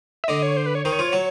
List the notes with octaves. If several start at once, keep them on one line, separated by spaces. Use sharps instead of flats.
E5
D3 D4 D#5
C#5
C5
B4
C#5
D#3 D#4 C5
C#5
F3 F4
F#3 F#4